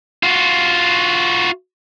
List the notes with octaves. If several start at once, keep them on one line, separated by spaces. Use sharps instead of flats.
F4 F#4